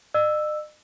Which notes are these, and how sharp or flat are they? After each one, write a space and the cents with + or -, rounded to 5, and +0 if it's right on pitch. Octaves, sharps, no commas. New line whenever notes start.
D#5 -45 E6 +0